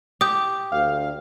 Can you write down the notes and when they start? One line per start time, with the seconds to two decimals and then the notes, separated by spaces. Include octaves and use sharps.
0.21 G4 D#6 G6
0.72 D2 F5